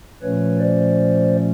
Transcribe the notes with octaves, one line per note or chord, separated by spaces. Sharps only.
A#2 F3 A3 C#4 B4 C#5
C5 D5